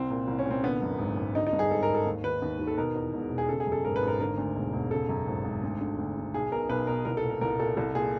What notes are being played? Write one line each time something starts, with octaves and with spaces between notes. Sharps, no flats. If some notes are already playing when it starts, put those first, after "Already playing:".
Already playing: C2 C4
A#2
C2
C#4
A#2
C4
D3 B3
F#2
G#1
G#1
D3 D#4
D#4
G2
G#4
G#1 A4
A#4
G#1
A4
D#2
D#3 B4
D#2
D#3
A4
B2 A#4
E2
E1
E1
G#4
C#3 A4
G#4
F#2
A4
G#1 A#4
B4
G#1
A#4
D3 A#4
D2
E1
E1
C#3 A4
F#2
G#1
G#1
D2
D3
D2
D3
B1 G#4
B2 A#4
B1 B4
B2 A#4
C2 A#4
A4
A#2
A#4
C2 A#4
A#2 A4
C2 A4
A#2 G#4